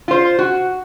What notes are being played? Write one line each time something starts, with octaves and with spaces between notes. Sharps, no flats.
F4 C5
F#4